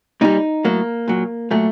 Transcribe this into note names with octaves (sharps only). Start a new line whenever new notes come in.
A#2 G3 D#4
A2 F#3 A#3
A#2 F#3
A#2 F#3 A3